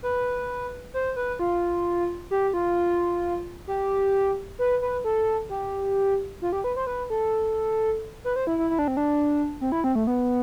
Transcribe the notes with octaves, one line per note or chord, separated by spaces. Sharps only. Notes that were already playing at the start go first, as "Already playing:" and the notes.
B4
C5
B4
F4
G4
F4
G4
B4
B4
A4
G4
F4
G4
B4
C5
B4
A4
B4
C5
E4
E4
E4
D4
C4
D4
C4
E4
C4
A3
B3